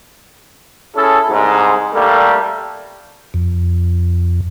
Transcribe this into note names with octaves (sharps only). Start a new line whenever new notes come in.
C#4 E4 G#4 A4
C2 G#2
G3 A3 A#3 D4 A4
F2